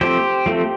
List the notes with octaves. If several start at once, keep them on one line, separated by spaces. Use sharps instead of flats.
F3 A3 C4 G4 C5
F3 A3 C4